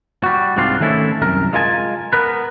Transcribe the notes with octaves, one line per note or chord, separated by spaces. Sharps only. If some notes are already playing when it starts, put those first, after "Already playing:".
G3 F#4
C2 G#2 C4 D4 F4 C6
D#3 A3 C#4 E4 A4
C2 F#2 A#4
G#3 F4 A#4 G#5 A5
B3 A#4 B4